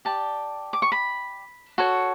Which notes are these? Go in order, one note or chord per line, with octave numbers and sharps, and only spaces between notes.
G4 D5 A5
D6
C#6
B5
F#4 A4 C#5